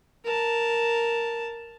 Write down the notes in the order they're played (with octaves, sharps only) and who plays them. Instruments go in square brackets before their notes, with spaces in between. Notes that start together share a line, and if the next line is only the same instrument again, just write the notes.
[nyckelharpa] A#4 A5